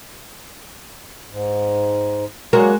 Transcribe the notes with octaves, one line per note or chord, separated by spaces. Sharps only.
G#2
F#3 G#3 A#3 F#4 A#4